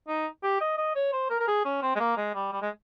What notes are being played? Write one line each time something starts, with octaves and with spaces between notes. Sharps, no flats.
D#4
G4
D#5
D#5
C#5
C5
A#4
A#4
G#4
C#4
C4
G#3
A#3
G#3
G3
G3
G#3